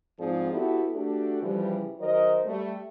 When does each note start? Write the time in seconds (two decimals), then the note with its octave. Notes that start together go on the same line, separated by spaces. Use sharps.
0.18 G#2 F3 C4 G#4 D5
0.51 B3 E4 F#4 G4 A4
0.93 A3 D4 F#4 G4 A4
1.41 C#3 E3 F3 G3
1.99 D#3 F#3 A#4 C5 D#5
2.45 G3 A3